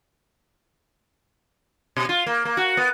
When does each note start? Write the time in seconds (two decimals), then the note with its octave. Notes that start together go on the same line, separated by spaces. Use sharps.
1.97 B2
2.09 F4
2.26 A#3
2.45 A#3
2.57 F#4
2.77 B3